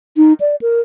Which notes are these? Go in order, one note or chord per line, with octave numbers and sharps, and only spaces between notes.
D#4
D5
A#4